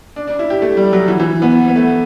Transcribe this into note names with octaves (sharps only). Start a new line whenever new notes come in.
D4
D4
E4
G4
A3
G3
F#3
E3
E3
B3
B3
A3